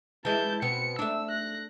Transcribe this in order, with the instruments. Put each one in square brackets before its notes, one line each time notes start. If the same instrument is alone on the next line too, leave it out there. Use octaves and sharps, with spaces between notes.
[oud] E3 G#3 [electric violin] A5 G6
[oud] B2 B3 C4 [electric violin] C#7
[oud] A3 D4 [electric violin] E6
[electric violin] F#6 A#6